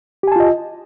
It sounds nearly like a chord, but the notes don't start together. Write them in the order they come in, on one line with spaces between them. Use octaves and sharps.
G4 G#5 A5 F4 D#5